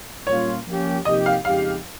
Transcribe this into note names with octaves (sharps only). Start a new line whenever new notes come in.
A#2 G3 A#3 C#4 F4 C#5
F3 A#3 C#4 G4
C3 F3 A#3 D#4 G4 D#5
F5
F2 C#3 G#3 D#4 G4 F5